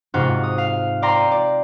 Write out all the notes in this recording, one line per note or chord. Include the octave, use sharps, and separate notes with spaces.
G#2 C3 F4 F#4
D#6
F5
D5 G5 A#5 C6 A#6
D5